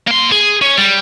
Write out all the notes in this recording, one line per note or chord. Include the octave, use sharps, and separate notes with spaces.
A#3 C6
G#4
C#4
G3